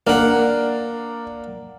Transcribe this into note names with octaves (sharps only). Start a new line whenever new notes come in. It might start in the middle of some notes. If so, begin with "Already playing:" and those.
A#3 D4 A#4 D5 F#5